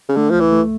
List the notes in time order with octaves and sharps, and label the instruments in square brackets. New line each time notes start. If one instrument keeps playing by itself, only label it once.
[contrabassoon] C#3
[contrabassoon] D3 [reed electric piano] A3
[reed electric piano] C#2 [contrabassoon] F3
[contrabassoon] E3
[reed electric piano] A3